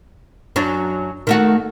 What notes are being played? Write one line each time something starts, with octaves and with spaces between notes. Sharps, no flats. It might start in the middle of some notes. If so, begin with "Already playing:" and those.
F#2 F#3 D4
D#3 A3 F#4